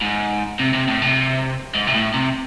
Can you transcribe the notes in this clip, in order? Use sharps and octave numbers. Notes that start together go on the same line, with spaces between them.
G#2
C3
C3
A2
C3
G#2
C3
A2
C3